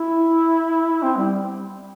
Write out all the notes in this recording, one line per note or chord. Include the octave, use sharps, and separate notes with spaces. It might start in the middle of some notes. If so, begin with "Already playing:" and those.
Already playing: E4
C4
G3